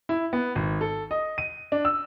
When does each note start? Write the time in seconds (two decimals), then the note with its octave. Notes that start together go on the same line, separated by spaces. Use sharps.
0.09 E4
0.33 B3
0.55 G#1
0.81 A4
1.11 D#5
1.38 D#7
1.72 D4
1.85 E6